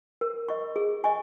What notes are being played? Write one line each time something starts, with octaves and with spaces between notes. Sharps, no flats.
A#4
D#5 C#6
G#4
D#5 G#5 C#6